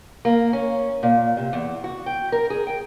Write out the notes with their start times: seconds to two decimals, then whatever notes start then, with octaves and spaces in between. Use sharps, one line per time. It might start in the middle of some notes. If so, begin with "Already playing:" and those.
0.25 A#3
0.53 C#4
1.03 A#2
1.37 C3
1.53 E2
1.84 F#4
2.06 G5
2.32 A#4
2.50 G#4
2.67 G5